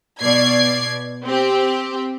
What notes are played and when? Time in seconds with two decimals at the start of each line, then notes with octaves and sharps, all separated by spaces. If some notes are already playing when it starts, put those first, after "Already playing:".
0.20 B2 D5 G#6 C7
1.24 C4 G4